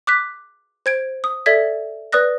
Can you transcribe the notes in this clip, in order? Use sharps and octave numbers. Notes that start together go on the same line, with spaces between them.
D6 F#6 B6
C5 G#6 D7
D#6
A4 D5 E5 G#6 B6
B4 D5 D#6 F#6 A#6